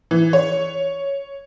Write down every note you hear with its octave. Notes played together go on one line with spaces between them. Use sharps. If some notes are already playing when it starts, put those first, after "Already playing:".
E3
C#5